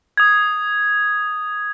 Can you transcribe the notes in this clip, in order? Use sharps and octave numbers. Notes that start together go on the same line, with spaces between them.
D#6 G#6